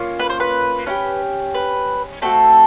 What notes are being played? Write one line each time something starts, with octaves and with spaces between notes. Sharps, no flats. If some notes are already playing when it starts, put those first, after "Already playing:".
Already playing: A#3 C#4 F4
B4
C5
B4
C#4 E4 G4
B4
A3 C4 F#4 A4